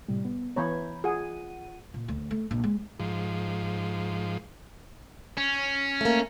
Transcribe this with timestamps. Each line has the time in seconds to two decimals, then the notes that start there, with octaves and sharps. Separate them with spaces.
0.08 A2 C3 G3
0.25 B3
0.56 E3 B3 C#5 A#5 B5 G6
1.04 F4 G#4 F#5 D#7
1.94 A#2
2.08 D2
2.31 A3
2.51 A#1
2.64 G#3
3.00 G#2 F3
5.38 C#4
6.01 A3 A#3